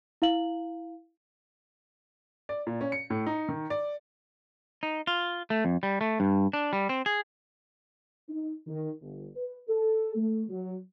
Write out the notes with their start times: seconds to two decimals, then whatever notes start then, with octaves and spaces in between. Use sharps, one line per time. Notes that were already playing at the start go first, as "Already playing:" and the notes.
0.22 E4 F5 F#7
2.49 D5
2.67 A#2
2.81 C#4
2.92 C#7
3.10 A2
3.27 D#4
3.49 D#3
3.70 D5
4.83 D#4
5.07 F4
5.50 A3
5.65 F2
5.83 G3
6.01 A3
6.20 G2
6.53 D4
6.73 G3
6.89 C4
7.06 G#4
8.28 D#4
8.67 D#3
9.01 G1
9.36 B4
9.68 A4
10.15 A3
10.48 F#3